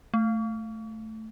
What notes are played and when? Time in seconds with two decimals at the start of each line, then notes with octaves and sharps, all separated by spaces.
0.14 A3